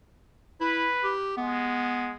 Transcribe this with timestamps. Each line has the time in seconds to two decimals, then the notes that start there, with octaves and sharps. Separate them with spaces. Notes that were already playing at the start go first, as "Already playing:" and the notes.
0.61 E4 B4
1.04 G4
1.37 G#3 B3